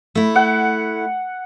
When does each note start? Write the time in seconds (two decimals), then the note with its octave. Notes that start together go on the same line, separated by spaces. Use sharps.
0.15 A3 E4
0.36 F#5